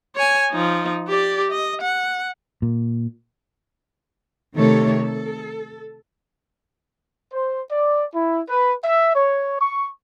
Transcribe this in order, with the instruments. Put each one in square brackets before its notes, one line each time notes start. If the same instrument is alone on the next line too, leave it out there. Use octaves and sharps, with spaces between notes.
[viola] C#5 G#5
F3 D#4
G4 D5
D#5
F#5
[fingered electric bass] A#2
[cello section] C3 D#3 A3 A4 C#5
A4
[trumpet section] C5
D5
E4
B4
E5
C#5
C#6